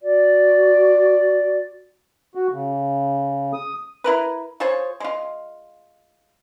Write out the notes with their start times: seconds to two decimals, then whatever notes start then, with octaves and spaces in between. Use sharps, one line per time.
0.01 F#4 D5
2.35 F#4
2.52 C#3
3.54 D#6
4.04 E4 A#4 B4
4.60 F4 G#4 C5 C#5
5.00 G#3 F4